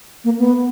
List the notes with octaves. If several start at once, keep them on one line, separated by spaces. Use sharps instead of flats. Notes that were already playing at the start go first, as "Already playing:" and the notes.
A#3
B3